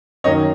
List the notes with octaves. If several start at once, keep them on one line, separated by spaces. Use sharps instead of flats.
F#2 D#3 F#3 A#3 C#5 D#5